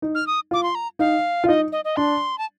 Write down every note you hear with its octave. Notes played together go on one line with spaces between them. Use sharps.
D#4
F6
D#6
F4 D6
C6
A#5
D#4 F5
F4
D#4 D#5
D#5
D#5
D4 C6
A5